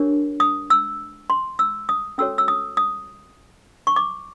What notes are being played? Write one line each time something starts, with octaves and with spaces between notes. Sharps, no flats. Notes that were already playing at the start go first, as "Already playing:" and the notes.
Already playing: D4 G4 A#4 C#5
D#6
E6
C6
E6
D#6
C#4 F#4 A4 C#5 E6
E6
D#6
D#6
C#6
D6